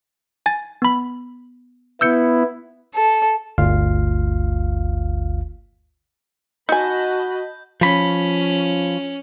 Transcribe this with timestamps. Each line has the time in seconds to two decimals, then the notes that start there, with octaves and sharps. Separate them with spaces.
0.46 G#5 A6
0.82 B3 B5
2.01 B3 E4 E6 G6 C#7
2.93 A4
3.58 G1 D2 F4 F5
6.69 D#4 F#4 D#5 G#5 A5 B5 G6
7.81 F3 C#4 B5